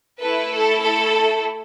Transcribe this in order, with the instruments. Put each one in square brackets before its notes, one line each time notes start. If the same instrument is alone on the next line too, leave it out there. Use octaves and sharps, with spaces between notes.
[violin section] A3 E4 A4 B4
A4
A4